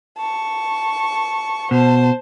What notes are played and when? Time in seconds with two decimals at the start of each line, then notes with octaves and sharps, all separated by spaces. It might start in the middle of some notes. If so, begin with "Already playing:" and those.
0.17 A5 C#6
1.71 B2 C5 A5